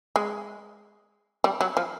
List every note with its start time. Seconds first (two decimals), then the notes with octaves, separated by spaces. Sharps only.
0.16 G#3
1.44 G3
1.61 F#3
1.77 F3